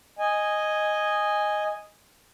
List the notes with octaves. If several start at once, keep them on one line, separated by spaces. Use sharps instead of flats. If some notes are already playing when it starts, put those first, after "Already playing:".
D#5 G#5